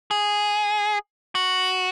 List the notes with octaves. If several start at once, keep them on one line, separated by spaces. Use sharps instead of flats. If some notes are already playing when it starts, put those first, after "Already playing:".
G#4
F#4